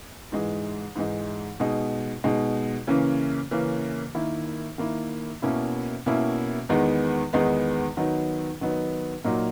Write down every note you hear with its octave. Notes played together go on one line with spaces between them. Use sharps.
G#2 E3 G#3 D#4
G#2 E3 G#3 D#4
B2 G#3 D#4
B2 G#3 D#4
C#3 E3 A#3 C#4
C#3 E3 A#3 C#4
D#3 A#3 E4
D#3 A#3 E4
B2 A#3 C#4 E4
B2 A#3 C#4 E4
E2 D#3 G#3 B3 D#4
E2 D#3 G#3 B3 D#4
D#3 F#3 B3 D#4
D#3 F#3 B3 D#4
A#2 F#3 A#3 D#4